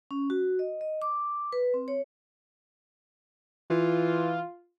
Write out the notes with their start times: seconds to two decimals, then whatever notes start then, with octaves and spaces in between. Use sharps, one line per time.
0.11 C#4
0.30 F#4
0.59 D#5
0.81 D#5
1.02 D6
1.53 B4
1.74 C4
1.88 C#5
3.70 E3 F4